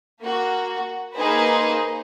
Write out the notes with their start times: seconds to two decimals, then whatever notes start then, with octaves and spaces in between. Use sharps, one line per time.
0.20 A#3 F#4
1.15 A#3 D#4 G#4 B4 C5